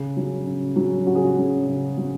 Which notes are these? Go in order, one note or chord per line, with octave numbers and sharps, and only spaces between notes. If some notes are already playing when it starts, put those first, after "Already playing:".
Already playing: C#3
F#3 C#4
C#3
F#3 C#4
C#3 F#4
G#4
F#4
F#3 C#4
C#3
F#3 C#4